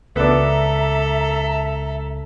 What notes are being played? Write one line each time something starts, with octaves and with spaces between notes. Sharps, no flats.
C#2 B3 D4 A4 E5 A#5